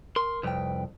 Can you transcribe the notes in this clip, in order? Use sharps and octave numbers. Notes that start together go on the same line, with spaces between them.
A#4 C6
C2 F2 B4 G5